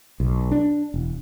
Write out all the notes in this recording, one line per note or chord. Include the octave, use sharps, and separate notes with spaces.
B1
D4
E1